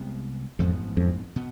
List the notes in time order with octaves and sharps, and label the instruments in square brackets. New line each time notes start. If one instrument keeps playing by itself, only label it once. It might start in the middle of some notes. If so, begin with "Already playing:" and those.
Already playing: [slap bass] C2 C3 G#3 B3
[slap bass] A1 G#2 F3 B3 [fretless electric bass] F2
[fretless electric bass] F2
[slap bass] B2 B3